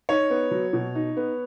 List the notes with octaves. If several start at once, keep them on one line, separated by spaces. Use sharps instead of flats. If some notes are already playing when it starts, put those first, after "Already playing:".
D#4 C#5
B3
F#3
B2
D#4
B3